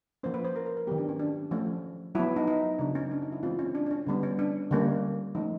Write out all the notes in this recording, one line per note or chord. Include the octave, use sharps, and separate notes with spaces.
F3 A#3 C#4 C5
B4
C5
A#4
A#4
A#4
D#3 F#3 B3 G4
D4
C#4
D4
F3 A3 C#4
F#3 B3 E4
D#4
D#4
C#3 F#3 B3 D4
C#4
D4
D#4
E4
E3 G#3 C4 F4
C#4
D4
D4
C#4
D3 G3 B3
C#4
D4
D3 G3 A#3 C#4
F3 A3 C#4 D#4